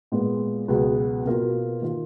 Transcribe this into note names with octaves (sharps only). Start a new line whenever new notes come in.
A#2 G#3 B3
C#2 B2 F#3 B3 F#4
B2 A#3 F4
D#3 A#3 F4